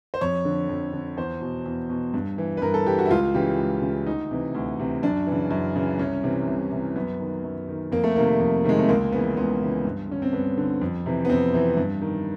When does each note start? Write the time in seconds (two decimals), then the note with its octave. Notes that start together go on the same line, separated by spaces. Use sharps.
0.14 C5
0.21 F2 C#5
0.45 D3
0.69 F2
0.93 D3
1.17 E2 C5
1.41 B2
1.66 E2
1.90 B2
2.14 G2
2.38 E3
2.57 B4
2.62 G2 A#4
2.74 A4
2.86 E3 G4
2.99 F#4
3.06 E4
3.11 C#2 F4
3.34 C#3 E3 G4
3.58 C#2
3.82 C#3 E3
4.06 D2 D#4
4.31 C3 E3
4.55 D2
4.79 C3 E3
5.03 F#2 D4
5.27 E3
5.32 C#3
5.51 F#2
5.76 C#3 E3
5.99 C2 C#4
6.24 C3 E3
6.47 C2
6.71 C3 E3
6.96 F#2 B3
7.20 D#3
7.43 F#2
7.69 D#3
7.92 F2 A#3
8.04 A3
8.16 C3 D#3 A#3
8.40 F2
8.64 C3 D#3 G#3
8.79 A3
8.89 C#2 A#3
9.12 C#3 B3
9.16 E3
9.37 C#2 B3
9.61 C#3 E3
9.85 G2
10.09 D3 C#4
10.22 C4
10.33 G2 B3
10.57 D3
10.81 F2
11.06 C3 E3
11.25 B3
11.29 F2 C4
11.54 C3 E3
11.77 G2
12.02 D#3